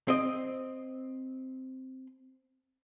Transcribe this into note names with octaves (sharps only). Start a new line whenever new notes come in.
C4 D#5